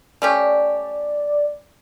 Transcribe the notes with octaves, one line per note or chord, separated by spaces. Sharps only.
A3 C#4 G4 D5